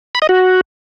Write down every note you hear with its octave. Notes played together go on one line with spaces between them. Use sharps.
B5
D#5
F#4